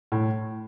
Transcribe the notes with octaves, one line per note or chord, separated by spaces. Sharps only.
A2